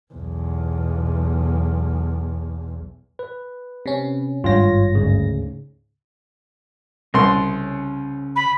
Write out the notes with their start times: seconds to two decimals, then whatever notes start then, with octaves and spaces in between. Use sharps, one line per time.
0.14 B1 E2
3.19 B4
3.86 C3 C#4
4.44 G#1 G2 F4 C#5 A#6
4.95 D2 G#2 C#3
7.14 C2 C#3 C#4 C6
8.36 B5